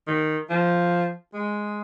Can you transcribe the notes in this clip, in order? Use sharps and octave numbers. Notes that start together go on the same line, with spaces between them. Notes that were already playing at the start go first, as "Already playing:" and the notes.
D#3
F3
G#3